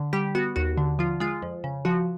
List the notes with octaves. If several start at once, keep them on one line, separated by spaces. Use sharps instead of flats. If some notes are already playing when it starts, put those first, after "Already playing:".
Already playing: D3
G3 G4
B3 F#4
D#2 F#4
D3
F3 F4
G#3 F4
F2
C#3
F3 F#4